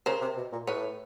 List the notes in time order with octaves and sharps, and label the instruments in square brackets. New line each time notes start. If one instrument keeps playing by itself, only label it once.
[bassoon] C#3 [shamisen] A#4 C5
[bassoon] C3
B2
A#2
[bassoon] A2 [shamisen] B4 C#5